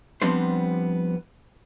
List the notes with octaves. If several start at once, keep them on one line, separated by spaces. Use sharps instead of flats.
F3 G3 B3 C4 D4 C5